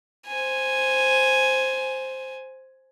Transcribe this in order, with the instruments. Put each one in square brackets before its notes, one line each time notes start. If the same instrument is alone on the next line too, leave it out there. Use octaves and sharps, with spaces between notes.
[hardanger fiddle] C5 G#5